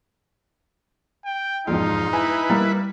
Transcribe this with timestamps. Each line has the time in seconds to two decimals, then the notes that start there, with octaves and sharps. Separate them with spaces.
1.25 G5
1.67 E1 F2 G#2 D#4 F4
2.13 E4 B4 G#5
2.50 G3 A#3